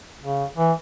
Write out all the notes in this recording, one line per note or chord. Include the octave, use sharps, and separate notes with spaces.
C#3
E3